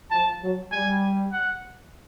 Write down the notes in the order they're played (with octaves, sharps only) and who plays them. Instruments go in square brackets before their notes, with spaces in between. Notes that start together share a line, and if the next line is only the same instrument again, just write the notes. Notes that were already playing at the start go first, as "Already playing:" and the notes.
[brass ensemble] F3 [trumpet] A5
[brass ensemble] F#3
[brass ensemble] G3 [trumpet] G#5
[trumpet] F#5